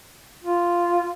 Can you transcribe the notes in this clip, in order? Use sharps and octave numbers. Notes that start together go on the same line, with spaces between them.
F4